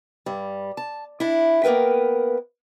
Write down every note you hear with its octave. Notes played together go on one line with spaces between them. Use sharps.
G2 G3
A5
D4 E4
A#3 B3 A#4 B4 G5